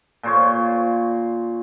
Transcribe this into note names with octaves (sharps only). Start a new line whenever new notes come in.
A#2 C5 C#5